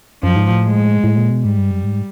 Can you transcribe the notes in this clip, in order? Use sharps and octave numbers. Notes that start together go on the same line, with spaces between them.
F#2 F3
G#2
A2
G#3
A2
A#2
B2
G#2 G3
G2
F#2
G#2